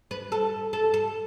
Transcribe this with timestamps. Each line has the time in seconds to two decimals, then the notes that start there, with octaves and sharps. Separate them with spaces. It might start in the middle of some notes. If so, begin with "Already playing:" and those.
0.11 B4
0.32 A4
0.73 A4
0.94 A4